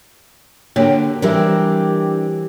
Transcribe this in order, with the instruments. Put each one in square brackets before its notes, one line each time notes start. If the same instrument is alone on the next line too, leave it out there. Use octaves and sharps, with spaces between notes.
[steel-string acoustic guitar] D3 [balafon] A#3 C#5 [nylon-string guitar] F#4 G4 A#4
[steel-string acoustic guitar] E3 G3 C4 [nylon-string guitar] D4 A#4 E5 [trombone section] G4